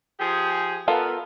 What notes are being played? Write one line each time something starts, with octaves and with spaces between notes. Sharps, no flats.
F3 G4 G#4
B3 F4 A4 A#4